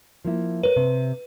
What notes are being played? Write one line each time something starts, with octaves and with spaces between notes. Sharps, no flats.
F3 A#3 E4
A#4 B4 C#5
C3